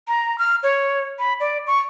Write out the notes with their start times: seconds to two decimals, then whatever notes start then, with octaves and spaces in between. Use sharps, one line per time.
0.08 A#5
0.39 F6
0.63 C#5
1.19 B5
1.40 D5
1.67 C#6